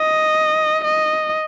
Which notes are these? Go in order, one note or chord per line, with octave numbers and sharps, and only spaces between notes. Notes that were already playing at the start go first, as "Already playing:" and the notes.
Already playing: D#5
D#5